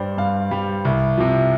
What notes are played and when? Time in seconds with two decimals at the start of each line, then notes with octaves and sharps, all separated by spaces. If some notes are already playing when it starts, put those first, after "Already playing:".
Already playing: G2 G3 C5 D5
0.18 G2 F5
0.51 G3
0.85 C2
1.18 C3 F3